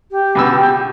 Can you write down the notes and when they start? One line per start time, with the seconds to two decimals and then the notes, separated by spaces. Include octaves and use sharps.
0.11 G4
0.35 C#2 B2 E6